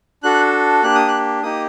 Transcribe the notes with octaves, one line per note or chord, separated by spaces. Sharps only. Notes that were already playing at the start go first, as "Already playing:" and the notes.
D4 F#4 A4 F#6
A#3 D4 G4 F#6
D#6
F#6
A#3 D#4 G4 D#6